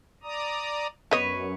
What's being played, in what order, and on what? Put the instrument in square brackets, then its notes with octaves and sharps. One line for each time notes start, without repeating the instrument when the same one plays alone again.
[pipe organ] D5 A#5 D#6
[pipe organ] F#2 [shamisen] B3 D#5 [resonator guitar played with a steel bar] B4 C#5